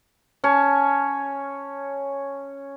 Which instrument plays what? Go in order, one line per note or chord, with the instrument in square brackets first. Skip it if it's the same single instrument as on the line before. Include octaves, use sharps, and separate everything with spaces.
[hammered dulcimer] C#4 C#5 A5